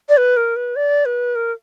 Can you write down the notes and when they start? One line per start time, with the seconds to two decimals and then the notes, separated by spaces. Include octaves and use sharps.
0.09 D5
0.17 B4
0.37 A#4
0.56 B4
0.76 D5
1.05 B4
1.35 A#4